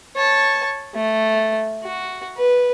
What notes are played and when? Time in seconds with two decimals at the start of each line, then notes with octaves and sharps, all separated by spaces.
0.16 C#5 A5
0.95 A3
1.84 F#4
2.37 B4